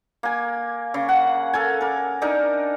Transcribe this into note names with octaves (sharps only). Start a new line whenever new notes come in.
A#3 G#5
C#3
F#5
A4 A#4 G#5
A#4 D6
D4 D#4 A#4